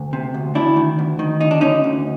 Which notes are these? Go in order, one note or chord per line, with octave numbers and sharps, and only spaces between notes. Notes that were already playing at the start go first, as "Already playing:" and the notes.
Already playing: D2
C3
D2
D2 D4 E4
D#3
D2
D#3
D2 D#4
D4
D3 C#4 D#4
D2